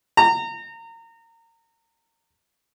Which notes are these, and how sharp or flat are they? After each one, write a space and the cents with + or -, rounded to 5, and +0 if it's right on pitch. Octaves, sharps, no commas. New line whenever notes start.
A#5 -30